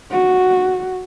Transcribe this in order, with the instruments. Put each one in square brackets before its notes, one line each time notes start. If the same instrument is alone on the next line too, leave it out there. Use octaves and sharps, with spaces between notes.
[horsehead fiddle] F#4